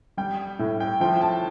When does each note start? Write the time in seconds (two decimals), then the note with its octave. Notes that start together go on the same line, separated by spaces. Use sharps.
0.17 G3 G5
0.59 A2
0.80 G5
1.00 F3 G5
1.21 A5